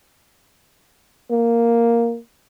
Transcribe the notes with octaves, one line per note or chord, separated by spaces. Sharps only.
A#3